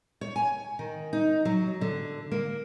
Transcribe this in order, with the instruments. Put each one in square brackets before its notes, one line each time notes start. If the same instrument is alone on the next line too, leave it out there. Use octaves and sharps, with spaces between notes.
[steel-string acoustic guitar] C#5
G#5
D#3
D#4
F#3
D3
A#3